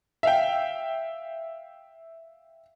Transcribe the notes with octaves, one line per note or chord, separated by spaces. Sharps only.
E5 F5 G5